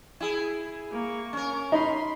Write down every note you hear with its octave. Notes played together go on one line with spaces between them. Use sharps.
E4 G#4
A#3 C#6
C#4 A#4
D#4 B5 C6